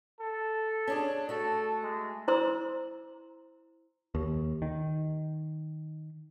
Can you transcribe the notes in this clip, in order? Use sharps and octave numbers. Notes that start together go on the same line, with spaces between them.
A4
C#4 D4 G#4
A3 F#4 A4
G#3
E4 C5 A#5 C6 E6
D#2
D#3